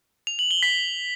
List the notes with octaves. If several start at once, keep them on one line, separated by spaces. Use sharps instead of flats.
F7
F#7
G7
B6